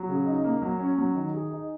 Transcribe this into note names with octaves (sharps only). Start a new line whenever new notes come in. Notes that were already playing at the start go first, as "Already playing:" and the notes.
Already playing: F#3
C#3
D#4
A#3
F#3
C#4
F#3
D#3
G#4
D#4